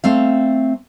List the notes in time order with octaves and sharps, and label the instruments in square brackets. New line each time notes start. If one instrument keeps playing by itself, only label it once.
[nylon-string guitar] A3 C4 F5